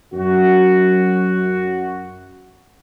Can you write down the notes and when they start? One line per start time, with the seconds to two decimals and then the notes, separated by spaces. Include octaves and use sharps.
0.14 F#2 F#4